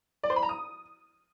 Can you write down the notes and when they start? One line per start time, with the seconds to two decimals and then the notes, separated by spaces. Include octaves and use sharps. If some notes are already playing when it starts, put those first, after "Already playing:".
0.23 D5
0.30 C5
0.36 B5
0.43 A#5
0.49 D#6